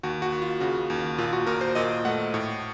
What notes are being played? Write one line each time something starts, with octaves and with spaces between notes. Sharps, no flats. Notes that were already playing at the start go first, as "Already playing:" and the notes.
D#2 F#4
F#4
D#2
F4
C#3 F#4
D#2
A#2 F4
F#4
A#2 A#4
C5
A#2 D#5
A3 F#5
A2